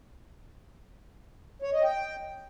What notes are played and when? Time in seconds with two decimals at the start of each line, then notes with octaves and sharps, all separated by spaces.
1.62 C#5
1.73 D#5
1.84 G5